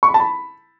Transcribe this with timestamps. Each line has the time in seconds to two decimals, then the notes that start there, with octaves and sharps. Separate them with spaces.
0.03 C#6
0.09 B5
0.14 A5
0.20 B5